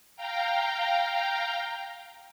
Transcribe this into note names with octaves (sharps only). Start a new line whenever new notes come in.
F5 G5 A#5